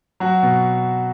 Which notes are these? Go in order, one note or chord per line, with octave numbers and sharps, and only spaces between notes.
F#3 F#4
B2